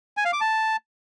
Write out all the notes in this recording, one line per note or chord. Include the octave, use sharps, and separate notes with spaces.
G#5
F5
D6
A5